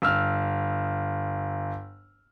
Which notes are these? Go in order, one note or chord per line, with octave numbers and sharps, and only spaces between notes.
G1 E6 F6